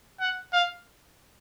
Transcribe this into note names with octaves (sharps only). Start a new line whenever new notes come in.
F#5
F5